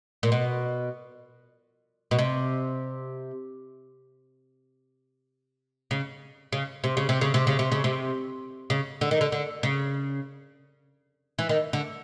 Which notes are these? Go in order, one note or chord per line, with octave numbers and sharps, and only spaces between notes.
A#2
B2
B2
C3
C#3
C#3
C3
C#3
C3
C#3
C3
C#3
C3
C#3
C3
C#3
D3
D#3
D3
D3
C#3
E3
D#3
D3